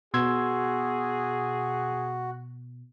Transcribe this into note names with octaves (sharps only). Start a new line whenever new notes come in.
B2 F#4 G#4 C6 E6 G#6